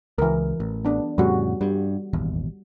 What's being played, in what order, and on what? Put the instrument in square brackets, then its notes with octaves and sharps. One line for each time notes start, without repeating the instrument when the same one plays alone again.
[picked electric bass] C#2 [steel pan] E3 A#4
[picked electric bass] A1
[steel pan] B3 D4
[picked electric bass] F2 A2 C#3 [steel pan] G3 F#4
[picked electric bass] G2 [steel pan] G3
[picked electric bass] D#1 G#1 E2